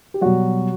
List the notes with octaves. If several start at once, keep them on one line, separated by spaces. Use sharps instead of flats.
G4
B2 F#3 G3 F#4